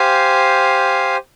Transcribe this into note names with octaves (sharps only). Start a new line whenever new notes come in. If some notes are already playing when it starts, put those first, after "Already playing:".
Already playing: G4 C5 F5 G#5